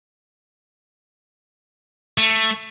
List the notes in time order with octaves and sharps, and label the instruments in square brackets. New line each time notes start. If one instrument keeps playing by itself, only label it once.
[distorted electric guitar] A3